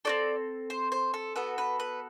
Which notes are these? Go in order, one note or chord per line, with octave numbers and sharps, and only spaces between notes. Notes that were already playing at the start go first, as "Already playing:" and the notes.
C4 F#4 A4 D5
C5
C5
A4
B3 F#4 A4 B4
B4
B4